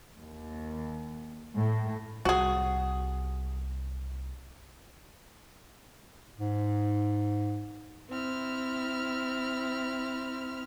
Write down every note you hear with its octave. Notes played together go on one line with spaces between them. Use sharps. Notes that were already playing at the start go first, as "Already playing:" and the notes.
D#2
A2
C2 F#4 G#4
G#2
C4 E4 F6